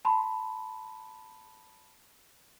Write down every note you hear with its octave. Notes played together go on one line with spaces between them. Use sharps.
A5 B5 C6